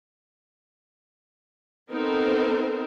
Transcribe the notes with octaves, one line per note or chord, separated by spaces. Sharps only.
B3 C4 D#4 A4 A#4 C5